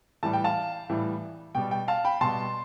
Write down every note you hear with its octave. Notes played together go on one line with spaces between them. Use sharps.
A2 E3 G3 A5
G5
F5 A5
A2 E3 G3
B2 G3 G5
G5
F5 A5
G5 B5
B2 G3 A5 C6